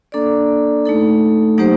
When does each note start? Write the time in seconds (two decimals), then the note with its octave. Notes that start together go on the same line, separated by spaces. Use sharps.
0.12 A#3 D4 A4 D5
0.85 A3 D#4 A4
1.58 F#3 A#3 D#4 G4 C5